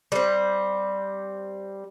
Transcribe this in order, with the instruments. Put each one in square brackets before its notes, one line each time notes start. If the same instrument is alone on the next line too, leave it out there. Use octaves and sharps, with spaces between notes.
[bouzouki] G3 C4